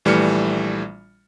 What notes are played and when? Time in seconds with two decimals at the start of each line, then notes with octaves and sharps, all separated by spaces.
0.05 A#1 E3 G3 A3 F6 C#7